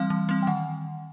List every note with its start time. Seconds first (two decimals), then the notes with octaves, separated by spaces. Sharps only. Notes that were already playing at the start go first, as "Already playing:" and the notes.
Already playing: E3 G3 C4 F5
0.10 E3
0.29 G3 C4
0.43 G5
0.47 D#3 F#5